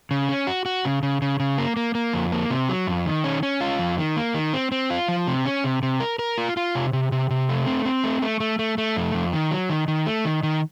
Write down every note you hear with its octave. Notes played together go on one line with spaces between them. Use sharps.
C#3
C#4
F#4
F#4
C#3
C#3
C#3
C#3
A#3
A#3
A#3
F2
A#3
C3
F#3
F2
D#3
C#4
C#4
F4
F2
D#3
A#3
D#3
C4
C4
F4
F3
C3
C#4
C3
C3
A#4
A#4
F4
F4
C3
C3
C3
C3
A3
C4
C4
A3
A3
A3
A3
A3
F2
F2
D#3
F#3
D#3
D#3
A3
D#3
D#3